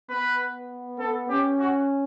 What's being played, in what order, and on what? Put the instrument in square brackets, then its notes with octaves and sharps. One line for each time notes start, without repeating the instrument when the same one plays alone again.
[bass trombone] B3 [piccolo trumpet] B4
[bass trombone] B3 [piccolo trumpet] A4
[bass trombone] C#4 [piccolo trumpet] G4
[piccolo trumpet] F#4